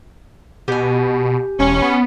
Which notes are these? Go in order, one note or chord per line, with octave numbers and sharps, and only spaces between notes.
B2 G4 G#5
E1 C#4
B3